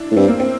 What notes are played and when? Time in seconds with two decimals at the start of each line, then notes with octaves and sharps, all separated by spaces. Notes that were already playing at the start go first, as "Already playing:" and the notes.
Already playing: D4 E4
0.11 A2
0.16 G2 C4
0.28 A#3
0.40 C4